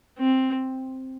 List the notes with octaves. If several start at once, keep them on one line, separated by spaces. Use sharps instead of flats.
C4